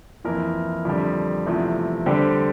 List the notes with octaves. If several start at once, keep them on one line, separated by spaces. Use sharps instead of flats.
F2 E3 A#3 E4 A#4
F2 D3 G3
E2 C3 F3 A3
D3 G3 C4 G4